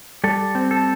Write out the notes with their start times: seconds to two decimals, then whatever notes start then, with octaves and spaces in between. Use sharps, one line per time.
0.24 G3 A4
0.55 C4
0.71 A4